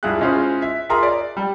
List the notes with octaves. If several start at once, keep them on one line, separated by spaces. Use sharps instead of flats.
G2 E4 F4 G#4 F#6
G#3 C#4 E4 F4 G#4 C5
E5
F4 G#4 A#4 E5 A#5 C6
D5
G3